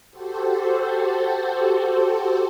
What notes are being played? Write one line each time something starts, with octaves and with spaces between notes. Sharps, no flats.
F#4 G4 A4 C5